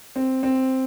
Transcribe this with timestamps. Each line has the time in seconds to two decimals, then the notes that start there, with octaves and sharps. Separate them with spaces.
0.16 C4
0.43 C4